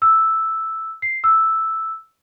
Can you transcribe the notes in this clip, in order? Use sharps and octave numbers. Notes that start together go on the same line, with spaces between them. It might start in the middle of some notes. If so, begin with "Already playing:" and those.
E6
C7
E6